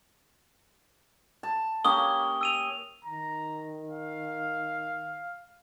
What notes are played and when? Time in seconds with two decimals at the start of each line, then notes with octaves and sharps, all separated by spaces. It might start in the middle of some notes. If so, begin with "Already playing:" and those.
1.43 A5
1.84 A#3 C#4 G4 D#6 G7
2.41 E6 D#7 F7
3.05 D#3 A#5
3.90 F5